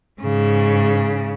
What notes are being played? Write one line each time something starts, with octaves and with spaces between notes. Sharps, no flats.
G#2 C#3